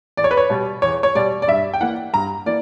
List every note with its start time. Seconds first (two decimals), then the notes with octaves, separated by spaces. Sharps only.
0.17 E2 D5
0.24 C#5
0.31 B4
0.37 C#5
0.50 B2 G3
0.82 E2 C#5
1.03 C#5
1.15 B2 G3 D5
1.42 D5
1.48 G2 E5
1.74 G5
1.81 E3 A#3 F#5
2.13 G2 A#5
2.46 E3 A#3 D5